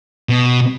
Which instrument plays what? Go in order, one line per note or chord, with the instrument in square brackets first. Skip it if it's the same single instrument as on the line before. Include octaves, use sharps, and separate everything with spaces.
[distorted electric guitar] B2